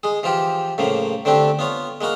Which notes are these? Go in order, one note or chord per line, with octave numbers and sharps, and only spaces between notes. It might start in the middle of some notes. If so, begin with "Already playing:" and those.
G#3 G#4
E3 F3 F4 G4
A2 C#3 F3 A#3
D3 A3 C4 D4 G4
B3 F4 C#5
G#3 A#3 F#4 F5